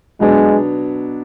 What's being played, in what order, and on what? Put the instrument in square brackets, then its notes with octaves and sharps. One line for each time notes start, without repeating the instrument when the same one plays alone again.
[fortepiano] B2 F#3 B3 D4 [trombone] G#3